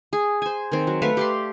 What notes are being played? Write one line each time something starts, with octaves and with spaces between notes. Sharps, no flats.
G#4
C5 G#5
D#3 C4
F#3
A3 B4 E5 F5
G4 D5 C6